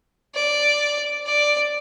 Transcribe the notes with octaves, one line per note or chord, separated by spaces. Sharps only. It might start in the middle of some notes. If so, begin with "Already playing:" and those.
D5
D5